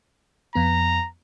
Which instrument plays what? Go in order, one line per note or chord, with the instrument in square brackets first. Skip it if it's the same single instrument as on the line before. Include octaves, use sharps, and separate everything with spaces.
[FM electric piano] F2 B3 [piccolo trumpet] A#5